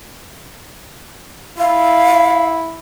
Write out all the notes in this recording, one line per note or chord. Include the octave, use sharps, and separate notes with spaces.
E4 F5